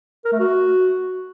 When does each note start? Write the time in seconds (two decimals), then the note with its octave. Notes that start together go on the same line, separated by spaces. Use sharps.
0.25 A#4
0.32 A3
0.40 F#4